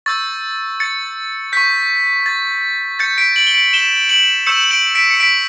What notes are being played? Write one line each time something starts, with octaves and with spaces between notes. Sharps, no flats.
C#6 E6 G6 A6
A6 C#7
C#6 G6 B6
A6
C#6 G6 A6 C#7
B6 D7
D7 F#7
G7
D7 F#7
E7 G7
D7 F#7
C#6 E6 G6 C#7 E7
D7 F#7
B6 D7
C#7
B6 D7